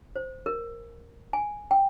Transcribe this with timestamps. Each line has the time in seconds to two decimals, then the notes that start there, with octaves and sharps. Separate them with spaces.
0.16 C5
0.46 A#4
1.33 G#5
1.71 G5